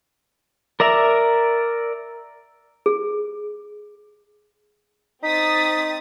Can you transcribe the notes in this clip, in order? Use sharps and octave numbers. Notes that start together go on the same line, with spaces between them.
A#4 D5 E5 A#5
G#4
C4 D#4 D#6 A6 B6